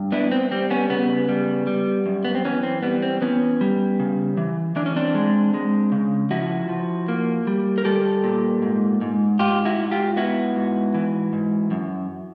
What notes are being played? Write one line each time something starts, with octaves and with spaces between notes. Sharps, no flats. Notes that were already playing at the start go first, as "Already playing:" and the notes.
Already playing: G2
B3 D4 E4
C4
G3 C4
B3 C#4
C#3 B3
G3
G3
F#2
B3
C4
E3 B3 C#4
C4
G3 B3
C4
E3 B3 C#4
G3
C#3
E3
E3 D4
C#4
C4 D4
G#3
G#3
C#3
F3 E4 F#4
F3
A#3
G3
A#4
G3 G4 A4
A#2
G#2
G#2
G#2 F4 G4
E4 F#4
G#2
F4 G4
B3 E4 F#4
G#2
E3
G#2
F#2